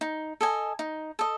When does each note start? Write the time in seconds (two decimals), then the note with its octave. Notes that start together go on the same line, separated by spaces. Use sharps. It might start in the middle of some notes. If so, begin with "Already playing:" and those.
0.01 D#4
0.41 A4 D#5 G#5
0.79 D#4
1.19 A4 D#5